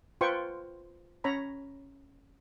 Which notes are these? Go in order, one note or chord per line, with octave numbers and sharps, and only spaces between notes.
F4 B4 C5 G5 C#6
C#4 C#5 A#5 B5